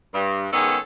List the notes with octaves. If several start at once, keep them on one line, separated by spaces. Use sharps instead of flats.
G2
G#2 D#3 B3 C#4 G#4 A4